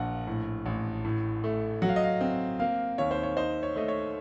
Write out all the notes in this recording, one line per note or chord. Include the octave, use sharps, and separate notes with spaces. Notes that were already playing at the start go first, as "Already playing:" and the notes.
Already playing: A#1 A#3 F#5
A2
A1
A2
A3
F#3 F#5
F5
D#5
F5
C4
A#3 F5
D#2 C#5
C5
C#5
D#4 C5
C#5
A3 D#5
C#5